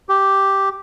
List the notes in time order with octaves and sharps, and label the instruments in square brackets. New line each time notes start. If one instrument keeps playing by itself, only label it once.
[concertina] G4